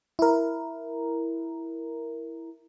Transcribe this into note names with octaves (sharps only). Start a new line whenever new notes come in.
E4 A#4